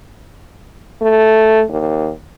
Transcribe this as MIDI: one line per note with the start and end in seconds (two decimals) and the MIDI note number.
1.01 1.63 57
1.69 2.09 39